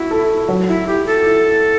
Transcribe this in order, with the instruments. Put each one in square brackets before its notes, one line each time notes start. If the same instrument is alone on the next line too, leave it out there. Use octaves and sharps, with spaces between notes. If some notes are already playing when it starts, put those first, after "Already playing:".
Already playing: [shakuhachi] E4 [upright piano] F#4
[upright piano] A4
F#3
[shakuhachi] E4
[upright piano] E4 [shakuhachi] G4
[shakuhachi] A4
[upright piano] E4